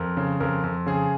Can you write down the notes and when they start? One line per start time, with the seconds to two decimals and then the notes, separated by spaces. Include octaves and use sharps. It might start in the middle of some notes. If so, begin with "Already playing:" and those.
Already playing: F2 A#4
0.17 C#3
0.40 F2 A#4
0.63 F2
0.86 C#3 G#4